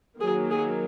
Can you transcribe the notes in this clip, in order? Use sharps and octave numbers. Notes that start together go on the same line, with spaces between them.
D#3 F#3 A#3 G#4
G#4